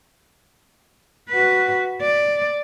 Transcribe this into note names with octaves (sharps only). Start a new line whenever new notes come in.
F#4 B4
D5